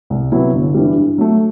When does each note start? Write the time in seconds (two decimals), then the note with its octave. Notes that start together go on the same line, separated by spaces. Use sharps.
0.10 C2
0.32 C3 F#3 B3 E4
0.54 G1
0.75 G2 E3 G3
0.96 G2
1.18 F#3 A3